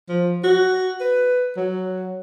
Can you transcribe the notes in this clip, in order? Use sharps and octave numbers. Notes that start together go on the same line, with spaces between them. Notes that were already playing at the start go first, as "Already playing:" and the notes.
F3
F#4
B4
F#3